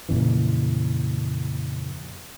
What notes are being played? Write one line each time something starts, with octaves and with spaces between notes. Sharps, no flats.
F2 A#2 C#3 E3